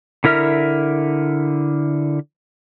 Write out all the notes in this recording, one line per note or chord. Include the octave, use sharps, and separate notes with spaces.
D3 E4 A#4 E5 F6